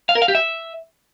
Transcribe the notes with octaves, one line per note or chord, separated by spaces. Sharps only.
F5
A#4
F5
G4
E5